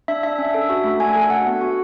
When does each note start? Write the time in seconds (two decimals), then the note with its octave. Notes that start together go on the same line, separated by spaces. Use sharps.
0.08 D4 E5
0.23 D4 E5
0.38 C#4
0.54 A4
0.70 F#4 E5
0.84 A3
1.00 D4 G#5
1.15 A4
1.30 F#4 F#5
1.46 B3
1.61 F#4